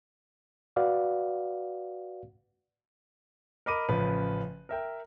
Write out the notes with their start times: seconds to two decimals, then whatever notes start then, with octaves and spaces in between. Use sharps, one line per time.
0.76 F#4 B4 D5 F5 F#5
3.66 A#4 D#5 B5 D6 D#7
3.89 A1 C#3 F3 B4
4.69 A#4 E5 G5